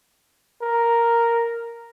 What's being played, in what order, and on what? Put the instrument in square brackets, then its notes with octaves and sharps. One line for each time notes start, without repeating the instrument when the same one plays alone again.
[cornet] A#4